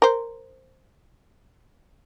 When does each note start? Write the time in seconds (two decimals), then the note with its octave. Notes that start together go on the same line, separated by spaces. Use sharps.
0.02 A#4 C5